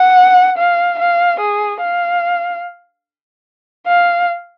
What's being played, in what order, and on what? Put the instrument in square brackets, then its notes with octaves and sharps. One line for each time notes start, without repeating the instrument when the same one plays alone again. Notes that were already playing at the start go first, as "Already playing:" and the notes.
Already playing: [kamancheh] F#5
F5
F5
G#4
F5
F5